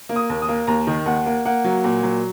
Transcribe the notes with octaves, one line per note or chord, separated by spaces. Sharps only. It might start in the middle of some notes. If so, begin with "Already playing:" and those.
A#3
D#6
D#2
D#6
A#3
D#2 A#5
D#3
D#2 F#5
A#3
A#3 F#5
F#3
A#2
F#3